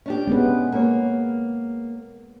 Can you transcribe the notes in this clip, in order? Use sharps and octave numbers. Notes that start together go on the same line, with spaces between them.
C#4 D4 G4
G#3 B3 B4
A#3 C#5